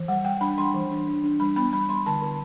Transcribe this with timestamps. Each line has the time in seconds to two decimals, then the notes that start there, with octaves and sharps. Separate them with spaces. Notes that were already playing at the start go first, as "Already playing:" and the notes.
Already playing: E3
0.08 G3 F#5
0.25 G3 G5
0.41 D4 B5
0.58 G3 C6
0.74 E3
0.91 D4
1.07 D4
1.24 D4
1.40 G3 B5
1.56 B3 B5
1.73 G3 B5
1.89 G3 C6
2.06 D3 A5
2.22 D3